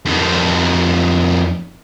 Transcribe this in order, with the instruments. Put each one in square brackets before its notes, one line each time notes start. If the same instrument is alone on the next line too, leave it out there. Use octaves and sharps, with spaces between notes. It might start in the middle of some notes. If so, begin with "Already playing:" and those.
[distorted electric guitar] F2 D#3